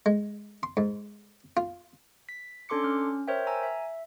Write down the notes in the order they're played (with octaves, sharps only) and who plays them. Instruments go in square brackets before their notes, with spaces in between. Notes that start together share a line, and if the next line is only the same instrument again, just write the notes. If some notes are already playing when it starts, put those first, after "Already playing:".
[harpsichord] G#3
C6
G#2
F4
[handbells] B6
C#4 D4 A4 C6 D6 C#7
C#4 F6
A#4 C5 C#5 E5 G5
G#5 A#5 E6
E5